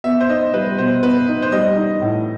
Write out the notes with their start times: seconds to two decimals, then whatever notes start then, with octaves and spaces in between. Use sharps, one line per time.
0.04 B3 E5
0.20 C5
0.29 D#4 D#5
0.53 G3 B4
0.78 B2 C5
1.03 B3 B4
1.28 D#4
1.42 C5
1.52 G3 D#5
1.76 D#4
2.01 A2